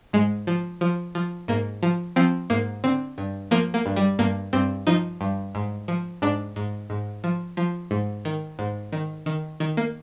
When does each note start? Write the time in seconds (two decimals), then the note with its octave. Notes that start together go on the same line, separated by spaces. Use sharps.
0.13 G#2 G#3
0.47 F3
0.81 F3
1.15 F3
1.48 G#2 A#3
1.83 F3
2.16 F3 C4
2.50 G#2 A#3
2.84 D3 C4
3.18 G2
3.51 F3 A#3
3.74 A#3
3.86 G2
3.96 G3
4.19 G2 A#3
4.53 G2 C4
4.87 F3 D#4
5.21 G2
5.55 G#2
5.88 F3
6.22 G#2 D4
6.56 G#2
6.90 G#2
7.24 F3
7.57 F3
7.91 G#2
8.25 D#3
8.59 G#2
8.92 D#3
9.26 D#3
9.60 D#3
9.77 A#3